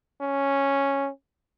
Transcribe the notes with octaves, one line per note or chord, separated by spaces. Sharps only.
C#4